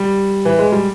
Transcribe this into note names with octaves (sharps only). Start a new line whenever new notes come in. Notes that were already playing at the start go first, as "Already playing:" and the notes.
Already playing: G3
E3
G#3
G3